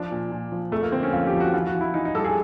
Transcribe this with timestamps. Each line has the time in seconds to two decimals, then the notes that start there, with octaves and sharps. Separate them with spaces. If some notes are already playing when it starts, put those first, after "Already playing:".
Already playing: F3 D4
0.11 A#2
0.32 A#2
0.52 F3
0.72 F2 A3
0.83 A#3
0.92 D3 C4
1.03 C#4
1.12 F2 F4
1.27 G4
1.34 F3
1.40 F#4
1.53 E3 F4
1.67 F#4
1.74 E3
1.81 E4
1.94 E3 D#4
2.05 D#4
2.15 G2 A4
2.25 G#4